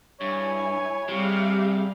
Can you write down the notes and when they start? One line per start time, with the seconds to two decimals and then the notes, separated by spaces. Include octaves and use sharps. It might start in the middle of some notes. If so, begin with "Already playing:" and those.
0.21 G2 E4 C#5 G#5
1.08 C3 G3 G4 G#4 F5